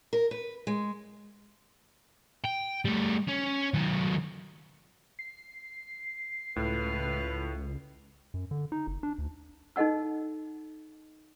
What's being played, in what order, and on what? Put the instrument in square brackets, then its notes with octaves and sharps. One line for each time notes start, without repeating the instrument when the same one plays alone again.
[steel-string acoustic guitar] A#4
B4
G#3
[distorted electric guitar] G5
G3 A3
C#4
D#3 F#3
[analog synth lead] C7
[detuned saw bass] C#2 [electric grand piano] A2 [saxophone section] F4 A4 B4
[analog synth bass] F#2
D3
D#4
F#1
D4
D2
[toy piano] D#4 A4 D#5 F#5 E6